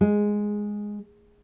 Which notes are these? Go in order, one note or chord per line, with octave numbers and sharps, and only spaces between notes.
G#3